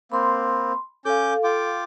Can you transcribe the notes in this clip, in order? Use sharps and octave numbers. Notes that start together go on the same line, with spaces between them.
A#3 C4 B5 C6
C#4 A4 F5 D6 G6
F4 G5 D6